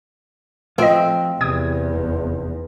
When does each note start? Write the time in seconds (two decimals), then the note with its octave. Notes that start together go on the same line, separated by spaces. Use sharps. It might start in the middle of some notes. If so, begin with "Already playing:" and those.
0.78 F3 A3 C4 F4 D#5
1.41 E2 C3 G5 D#6 G#6
1.95 F1